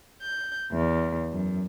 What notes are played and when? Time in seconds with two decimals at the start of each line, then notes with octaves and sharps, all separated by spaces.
0.22 G6
0.72 E2
1.30 F#2